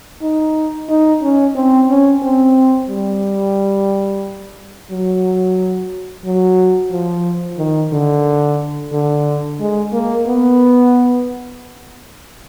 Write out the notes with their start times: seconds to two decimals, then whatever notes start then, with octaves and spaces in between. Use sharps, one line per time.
0.22 D#4
0.89 D#4
1.23 C#4
1.55 C4
1.89 C#4
2.22 C4
2.89 G3
4.91 F#3
6.25 F#3
6.92 F3
7.58 D#3
7.92 D3
8.92 D3
9.60 G#3
9.93 A#3
10.27 B3